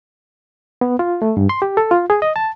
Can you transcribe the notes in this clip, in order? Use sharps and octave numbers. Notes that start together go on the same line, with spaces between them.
B3
F4
A3
G2
C6
G4
A4
F4
G#4
D#5
A5